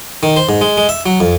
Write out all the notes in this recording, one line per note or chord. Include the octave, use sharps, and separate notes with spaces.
D#3
C5
G#2
G#3
G#3
E5
F#3
F2